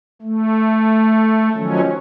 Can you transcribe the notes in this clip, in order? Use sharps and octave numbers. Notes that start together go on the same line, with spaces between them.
A3
D#3 F3 F#3 C#4